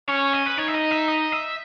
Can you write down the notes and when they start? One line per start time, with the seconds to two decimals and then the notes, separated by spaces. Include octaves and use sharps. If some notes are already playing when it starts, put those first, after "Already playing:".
0.08 C#4 C#5
0.33 D#5
0.46 B4
0.58 D#4 C#5
0.68 E5
0.75 D#5
0.91 E5
1.08 D#5
1.32 E5